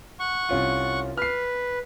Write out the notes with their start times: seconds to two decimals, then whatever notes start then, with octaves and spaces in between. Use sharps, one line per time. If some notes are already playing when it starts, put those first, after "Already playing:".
0.20 F#5 C#6
0.49 C2 C#4 F4
1.17 B4 F6 C7